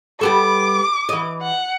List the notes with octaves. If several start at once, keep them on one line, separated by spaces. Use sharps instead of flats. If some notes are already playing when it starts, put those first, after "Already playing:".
G3 B3 A4 D6
E3 D#5
F#5